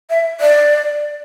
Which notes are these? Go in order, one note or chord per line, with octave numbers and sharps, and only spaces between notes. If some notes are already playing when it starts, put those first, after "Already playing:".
E5
D5